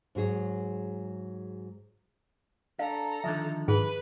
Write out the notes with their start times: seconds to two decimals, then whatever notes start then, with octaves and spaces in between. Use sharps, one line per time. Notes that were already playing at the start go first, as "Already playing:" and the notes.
0.15 G#2 F#3 G#4 C#5
2.79 D4 A4 F5 A#5
3.24 D3 D#3 F3 E5
3.68 G#2 G#4 B4